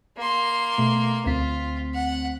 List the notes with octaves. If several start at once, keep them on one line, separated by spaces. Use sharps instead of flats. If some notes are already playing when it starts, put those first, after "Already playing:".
A#3 C6
B2 A3
D2 C4 F4 B6
F#5